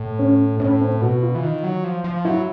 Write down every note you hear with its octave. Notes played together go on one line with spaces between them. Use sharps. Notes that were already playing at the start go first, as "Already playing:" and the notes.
Already playing: A2
C#4
A2 C#4
C4
B2 F#4
F4
E3
D#3
F#3
F3
F3
F#3 E4